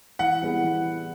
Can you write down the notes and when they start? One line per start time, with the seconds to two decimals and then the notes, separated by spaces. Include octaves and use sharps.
0.19 E3 F#5
0.42 G3 B3 E4 G#4
0.64 E3